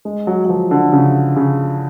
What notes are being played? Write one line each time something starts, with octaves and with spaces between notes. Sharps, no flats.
G#3
F#3
F#3
F3
D3
C#3
C#3